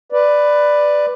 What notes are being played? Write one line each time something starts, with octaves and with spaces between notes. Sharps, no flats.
B4 D5